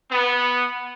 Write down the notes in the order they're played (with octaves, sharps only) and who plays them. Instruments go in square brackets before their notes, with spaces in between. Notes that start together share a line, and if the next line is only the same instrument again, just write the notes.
[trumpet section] B3